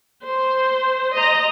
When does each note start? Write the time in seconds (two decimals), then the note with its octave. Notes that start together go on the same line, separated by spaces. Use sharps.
0.25 C5
1.14 D#5 A#5